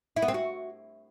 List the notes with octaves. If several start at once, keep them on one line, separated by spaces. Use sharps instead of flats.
E4
B3
C4
F#4